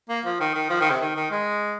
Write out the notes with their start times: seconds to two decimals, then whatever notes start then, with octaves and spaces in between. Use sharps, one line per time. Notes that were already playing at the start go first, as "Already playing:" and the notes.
0.09 A#3
0.25 F3
0.40 D#3
0.55 D#3
0.70 F3
0.81 D#3
0.90 C3
1.01 D#3
1.16 D#3
1.31 G#3